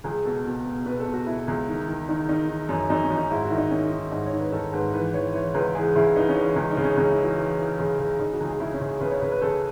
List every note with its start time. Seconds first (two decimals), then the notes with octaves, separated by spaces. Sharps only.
0.04 C#2 G#4
0.24 B2 A4
0.45 B2
0.65 B2
0.86 B2 B4
1.00 A4
1.07 B2
1.13 F#4
1.27 B2 E4
1.48 C#2
1.68 D#3
1.88 D#3
2.08 D#3 D#4
2.29 D#3 D#4
2.49 D#3
2.69 F#2
2.89 F#2 D#4
3.04 C#4
3.10 F#2
3.17 D#4
3.30 G#2 E4
3.44 F#4
3.50 D#3 E4
3.58 D#4
3.71 D#3 C#4
3.91 D#3
4.12 G#2 D#4
4.26 C#5
4.33 D#3
4.39 B4
4.52 D#3 A4
4.73 G#2 B4
4.93 E3 B4
5.14 E3 C#5
5.34 E3 C#5
5.54 C#2 B4
5.74 E3 G#4
5.96 C#3 E4
6.16 E3 D#4
6.29 C#4
6.36 E3
6.43 D#4
6.56 C#2 C#4
6.71 D#4
6.77 C#3
6.83 C#4
6.97 C#2 C#4
7.10 E4
7.18 E3
7.24 F#4
7.38 E3
7.59 E3
7.79 C#3
7.99 C#3
8.19 C#3 D#4
8.33 F#4
8.40 C#2
8.47 G#4
8.60 C#3 E4
8.74 C#4
8.81 C#3
9.00 C#3 B4
9.11 C#5
9.21 C#3 B4
9.32 B4
9.42 C#3 A4